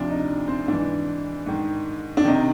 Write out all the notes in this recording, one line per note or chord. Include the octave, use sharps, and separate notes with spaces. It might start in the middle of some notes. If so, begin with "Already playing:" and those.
Already playing: D2 C3 F3 D4
D#4
C4
G#2 E3 D4
G#2 D#3
D4
C3 D#3 D#4